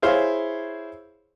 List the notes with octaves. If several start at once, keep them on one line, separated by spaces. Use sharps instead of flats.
E4 G#4 C5 C#5 F5